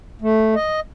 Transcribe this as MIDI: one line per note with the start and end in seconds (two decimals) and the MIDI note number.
0.22 0.55 57
0.56 0.80 75